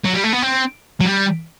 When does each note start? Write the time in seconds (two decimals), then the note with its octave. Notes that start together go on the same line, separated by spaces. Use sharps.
0.05 F#3
0.14 G3
0.24 A3
0.33 B3
0.42 C4
1.01 F#3
1.06 G3